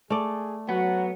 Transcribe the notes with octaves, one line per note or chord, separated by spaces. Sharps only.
A3 G#4 D5
F#3 B3 F#5